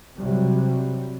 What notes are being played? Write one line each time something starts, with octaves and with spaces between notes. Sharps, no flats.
C3 F#3 G3